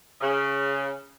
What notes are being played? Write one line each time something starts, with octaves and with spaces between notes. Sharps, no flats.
C#3